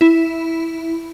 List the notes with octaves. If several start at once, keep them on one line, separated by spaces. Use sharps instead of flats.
E4